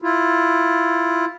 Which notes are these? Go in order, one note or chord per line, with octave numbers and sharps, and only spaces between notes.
E4 F4